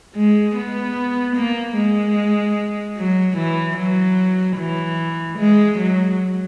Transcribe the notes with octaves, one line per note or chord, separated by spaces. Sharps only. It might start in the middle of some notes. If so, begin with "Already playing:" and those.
G#3
B3
A#3
G#3
F#3
E3
F#3
E3
G#3
F#3